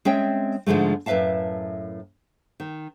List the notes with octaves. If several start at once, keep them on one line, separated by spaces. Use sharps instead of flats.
G#3 C4 C#4 E5 G5
G#2 D3 F3 G#3 A3
F#2 A2 B4 E5 F5 A5
D#3